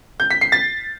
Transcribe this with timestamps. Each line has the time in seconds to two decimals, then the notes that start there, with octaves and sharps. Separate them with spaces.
0.20 G6
0.31 B6
0.41 C7
0.52 A6